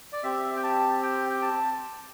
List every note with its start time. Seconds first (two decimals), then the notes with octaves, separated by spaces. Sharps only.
0.13 D5
0.23 C4 G4 E5
0.56 G5
0.63 A5
1.02 G5
1.29 G5
1.42 A5